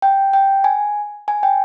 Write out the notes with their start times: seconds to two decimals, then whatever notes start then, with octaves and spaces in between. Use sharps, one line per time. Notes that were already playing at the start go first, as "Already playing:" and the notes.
0.02 G5
0.33 G5
0.64 G#5
1.28 G#5
1.43 G5